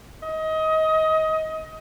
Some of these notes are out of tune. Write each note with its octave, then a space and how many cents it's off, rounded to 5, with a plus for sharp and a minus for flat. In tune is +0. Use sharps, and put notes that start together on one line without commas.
D#5 +25